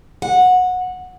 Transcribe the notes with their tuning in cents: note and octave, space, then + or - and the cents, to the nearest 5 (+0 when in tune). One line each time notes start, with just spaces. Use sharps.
F#5 -20